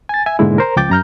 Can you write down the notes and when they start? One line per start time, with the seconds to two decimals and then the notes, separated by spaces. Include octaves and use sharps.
0.09 G#5 A6
0.26 E5 G#5
0.39 G#2 B2 D3 G#3 A#3 E4
0.58 A#4 C5 A#5
0.76 C#2 F3 G5 D6 G6 A6
0.90 F#2 A#5 F6 G6